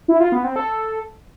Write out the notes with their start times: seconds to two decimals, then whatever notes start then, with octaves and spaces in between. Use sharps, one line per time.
0.08 E4
0.20 F4
0.32 B3
0.44 C4
0.56 A4